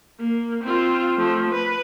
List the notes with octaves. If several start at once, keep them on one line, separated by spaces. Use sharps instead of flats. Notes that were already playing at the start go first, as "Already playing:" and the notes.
A#3
C4 F4
F3 A3
B4